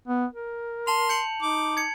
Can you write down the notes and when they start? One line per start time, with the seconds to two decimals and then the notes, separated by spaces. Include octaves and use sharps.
0.08 B3
0.33 A#4
0.87 A5 C6 F7
1.09 G6 C#7 F#7
1.42 D#4 D6
1.77 G#6 C#7